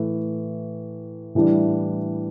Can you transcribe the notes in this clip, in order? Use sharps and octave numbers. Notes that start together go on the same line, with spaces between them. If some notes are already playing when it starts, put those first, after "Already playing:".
Already playing: A2 E3 A3
A2 E3 G3 D4